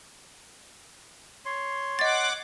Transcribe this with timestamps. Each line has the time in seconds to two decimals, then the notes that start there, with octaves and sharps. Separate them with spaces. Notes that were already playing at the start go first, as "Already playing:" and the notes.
1.45 C#5 C6
1.99 D#5 F#5 D6 A6